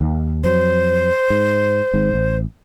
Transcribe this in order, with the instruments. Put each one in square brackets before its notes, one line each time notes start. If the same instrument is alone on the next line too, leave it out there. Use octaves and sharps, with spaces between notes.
[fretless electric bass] D#2
[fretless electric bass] F2 F#3 [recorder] C5
[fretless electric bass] G#2
G#1 G#2
A1